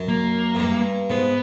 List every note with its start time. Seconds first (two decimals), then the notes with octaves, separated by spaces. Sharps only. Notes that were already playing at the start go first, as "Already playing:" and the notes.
Already playing: F#2
0.08 A#3
0.55 F#2
0.59 G2
1.10 G#2 B3